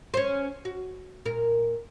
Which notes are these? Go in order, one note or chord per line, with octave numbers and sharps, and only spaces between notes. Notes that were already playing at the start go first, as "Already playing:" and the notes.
C#4 C5
F#4
A#2 A#4